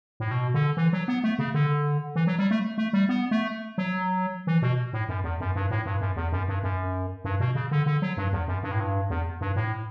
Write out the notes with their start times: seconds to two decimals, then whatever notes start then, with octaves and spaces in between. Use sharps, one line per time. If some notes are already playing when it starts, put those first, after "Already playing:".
0.20 A2
0.31 B2
0.54 D3
0.77 E3
0.93 F#3
1.08 B3
1.24 A3
1.39 C#3
1.54 D3
2.16 E3
2.27 F#3
2.39 G3
2.51 A3
2.78 A3
2.93 G3
3.09 B3
3.31 A3
3.78 F#3
4.47 E3
4.62 B2
4.93 A2
5.09 F#2
5.24 E2
5.40 F#2
5.55 G2
5.71 A2
5.86 G2
6.01 F#2
6.16 E2
6.32 F#2
6.48 G2
6.63 F#2
7.24 G2
7.40 B2
7.55 C#3
7.71 D3
7.86 D3
8.02 F#3
8.17 G2
8.33 E2
8.48 F#2
8.63 G2
8.71 A2
8.80 G2
9.10 E2
9.41 G2
9.56 A2